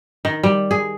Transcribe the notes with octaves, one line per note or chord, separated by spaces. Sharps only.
D#3
G3
G#4